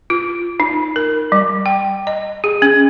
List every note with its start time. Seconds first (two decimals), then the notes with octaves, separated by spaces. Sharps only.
0.10 F4
0.60 D#4
0.96 A#4
1.32 G3
1.66 G5
2.07 D#5
2.44 G#4
2.62 C#4